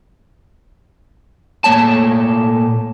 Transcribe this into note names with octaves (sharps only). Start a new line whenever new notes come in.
A#2 A3 A#3 C#5 A5